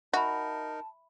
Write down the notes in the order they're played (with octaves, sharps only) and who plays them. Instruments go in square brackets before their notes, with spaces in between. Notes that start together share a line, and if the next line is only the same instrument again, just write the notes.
[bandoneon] D#4 A#4 [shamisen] F#4 [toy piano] E5 B5 [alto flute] A5